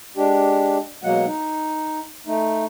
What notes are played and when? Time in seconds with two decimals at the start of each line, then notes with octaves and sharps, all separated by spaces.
0.17 G#3 D4 G4
1.03 B2 F#3 G#3 A#3 F#5
1.27 D#4
2.27 A3 D#4